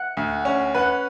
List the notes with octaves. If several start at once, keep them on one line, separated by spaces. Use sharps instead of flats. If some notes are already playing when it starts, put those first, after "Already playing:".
Already playing: E5 F#5
D2
C#4
B4 F#5